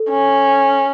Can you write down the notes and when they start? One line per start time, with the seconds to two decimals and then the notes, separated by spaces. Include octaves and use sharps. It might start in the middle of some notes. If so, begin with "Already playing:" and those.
Already playing: A4
0.10 C#4